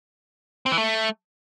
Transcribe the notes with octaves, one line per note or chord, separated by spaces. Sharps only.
C4
E3
A3